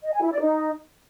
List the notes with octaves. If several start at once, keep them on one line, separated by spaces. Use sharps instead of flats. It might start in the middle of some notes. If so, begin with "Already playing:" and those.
D#5
G#5
E4
D5
D#4